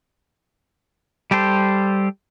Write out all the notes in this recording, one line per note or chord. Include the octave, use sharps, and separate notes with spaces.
G3 G4 A4 C5